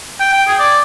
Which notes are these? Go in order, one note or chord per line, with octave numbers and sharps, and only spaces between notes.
G5
G5
G#4
D5